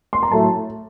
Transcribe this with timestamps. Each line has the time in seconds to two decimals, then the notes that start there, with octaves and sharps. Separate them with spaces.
0.13 C6
0.23 A#5
0.31 A2 F#3 A3 A5